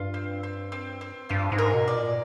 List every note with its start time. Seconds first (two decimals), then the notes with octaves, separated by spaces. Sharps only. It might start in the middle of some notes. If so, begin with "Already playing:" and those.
Already playing: G2 F4
0.14 C4
0.43 C4
0.72 C4
1.01 C4
1.29 G2 F4
1.52 G#2
1.58 A#4
1.73 B2
1.88 D5
1.95 A#2